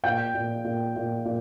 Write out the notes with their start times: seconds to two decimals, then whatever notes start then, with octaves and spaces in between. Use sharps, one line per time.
0.04 A#2 G5 G6
0.34 A#2
0.65 A#2
0.96 A#2
1.25 A#2